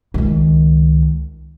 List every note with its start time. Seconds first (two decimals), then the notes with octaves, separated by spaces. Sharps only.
0.14 C#2 D#3